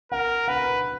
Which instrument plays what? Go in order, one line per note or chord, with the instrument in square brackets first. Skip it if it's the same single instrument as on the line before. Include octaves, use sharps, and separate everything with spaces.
[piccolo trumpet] A#4 [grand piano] F#5
[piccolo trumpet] B4 [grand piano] F#5